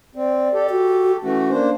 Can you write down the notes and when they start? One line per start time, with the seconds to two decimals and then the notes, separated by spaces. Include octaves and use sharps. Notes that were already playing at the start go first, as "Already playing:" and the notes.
0.15 C4 D5
0.53 G4 A4
0.70 F#4
1.23 E3 A3 C#4 F#4
1.51 A#3 D4 C5